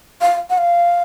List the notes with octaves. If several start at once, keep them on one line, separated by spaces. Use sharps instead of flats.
F5
F#5
F5